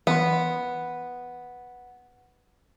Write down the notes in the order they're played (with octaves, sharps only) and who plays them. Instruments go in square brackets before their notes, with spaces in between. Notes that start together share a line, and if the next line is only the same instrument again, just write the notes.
[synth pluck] E3 C6 [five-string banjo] B3